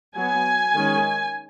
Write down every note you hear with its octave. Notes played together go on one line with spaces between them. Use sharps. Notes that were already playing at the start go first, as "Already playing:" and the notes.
F#3 B3 G#5
D#3 G#3 C#4